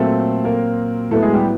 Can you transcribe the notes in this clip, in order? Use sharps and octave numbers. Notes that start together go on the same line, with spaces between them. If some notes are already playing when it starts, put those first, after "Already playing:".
Already playing: A#2 F#3 A3 C4 A4
A#3 A#4
A2 F#3 A3 B3 A4
G#3 G#4
G3 G4